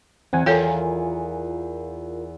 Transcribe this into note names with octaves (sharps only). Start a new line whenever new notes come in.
E2 C4 F#5 G#5
E2 F4 A4 A#4 C#5 G5 G#5